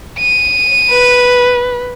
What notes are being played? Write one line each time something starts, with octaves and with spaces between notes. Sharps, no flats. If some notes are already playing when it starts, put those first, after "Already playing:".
D#7
B4